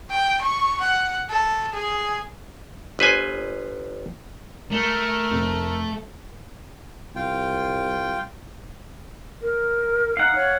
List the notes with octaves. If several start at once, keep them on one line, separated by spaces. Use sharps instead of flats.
G5
C#6
F#5
A4
G#4
G1 B4 C5 G#5
A3 A#4
F1 F2
C2 F4 G5
A#4
D#4 F5 F#5
C#5